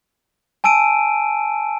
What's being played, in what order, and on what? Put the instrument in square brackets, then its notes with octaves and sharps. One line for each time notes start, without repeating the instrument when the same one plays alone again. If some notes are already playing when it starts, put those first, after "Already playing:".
[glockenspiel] G#5 A5 E6 D7 D#7